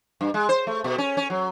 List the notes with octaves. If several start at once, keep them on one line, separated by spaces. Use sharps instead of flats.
G2
G#3
C5
A3
B2
C#4
C#4
F#3